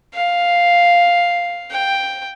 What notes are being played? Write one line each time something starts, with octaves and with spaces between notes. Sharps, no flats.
F5
G5